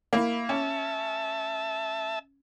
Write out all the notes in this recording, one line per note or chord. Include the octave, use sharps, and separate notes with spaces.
A#3 E4
C#4 E5 A5